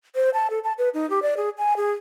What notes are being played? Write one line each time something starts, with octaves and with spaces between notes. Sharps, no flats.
C5
A5
A4
A5
B4
D#4
G4
D5
G#4
G#5
G#4